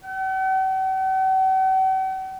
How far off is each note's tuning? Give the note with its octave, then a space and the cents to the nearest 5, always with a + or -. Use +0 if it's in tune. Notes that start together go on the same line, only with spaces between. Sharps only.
F#5 +45